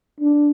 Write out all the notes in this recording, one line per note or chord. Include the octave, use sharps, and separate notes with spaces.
D4